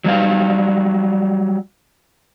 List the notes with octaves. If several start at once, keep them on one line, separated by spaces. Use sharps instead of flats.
F#3 G3 G4 F5